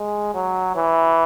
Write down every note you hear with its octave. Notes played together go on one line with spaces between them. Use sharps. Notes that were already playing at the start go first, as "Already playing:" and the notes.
Already playing: G#3
F#3
E3